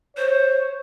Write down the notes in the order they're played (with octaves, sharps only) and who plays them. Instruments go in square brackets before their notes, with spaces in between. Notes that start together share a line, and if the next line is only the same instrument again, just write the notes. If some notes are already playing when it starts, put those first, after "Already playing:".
[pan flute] C5 [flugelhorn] C#5